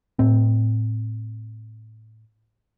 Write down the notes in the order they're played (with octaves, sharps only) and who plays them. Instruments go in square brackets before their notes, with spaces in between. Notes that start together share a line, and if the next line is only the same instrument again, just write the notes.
[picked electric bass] A2 C4